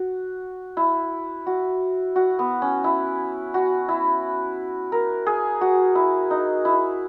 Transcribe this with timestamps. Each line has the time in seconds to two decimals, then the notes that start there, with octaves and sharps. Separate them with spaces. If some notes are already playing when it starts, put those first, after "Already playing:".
Already playing: F#4
0.77 E4
1.47 F#4
2.16 F#4
2.39 B3
2.62 C#4
2.84 E4
3.54 F#4
3.89 E4
4.92 A#4
5.27 G#4
5.61 F#4
5.95 E4
6.31 D#4
6.65 E4